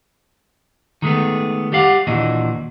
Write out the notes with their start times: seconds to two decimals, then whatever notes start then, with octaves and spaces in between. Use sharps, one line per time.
1.02 D#3 G#3 A3 B3
1.72 G3 G4 F5 F#5
2.07 D#2 A#2 E3 D4 F#4 D#5